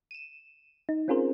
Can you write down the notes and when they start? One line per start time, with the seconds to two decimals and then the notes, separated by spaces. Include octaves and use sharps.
0.11 D#7 E7
0.89 D#4
1.08 C4 C#4 F4 G#4 A#4 C5